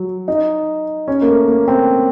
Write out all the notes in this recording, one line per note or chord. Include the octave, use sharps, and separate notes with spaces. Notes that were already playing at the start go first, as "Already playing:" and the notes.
Already playing: F#3
D#4
C#4
A#3
A3
A#3
C4